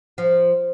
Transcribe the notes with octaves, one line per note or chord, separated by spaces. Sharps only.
F3